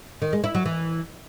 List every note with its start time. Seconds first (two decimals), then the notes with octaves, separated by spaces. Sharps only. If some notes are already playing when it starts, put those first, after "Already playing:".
0.22 D#3
0.33 G#3
0.44 E4
0.55 F#3
0.66 E3